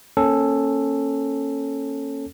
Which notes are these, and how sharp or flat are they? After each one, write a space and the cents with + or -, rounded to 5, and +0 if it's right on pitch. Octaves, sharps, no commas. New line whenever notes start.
A#3 +0 C#4 -15 A4 +0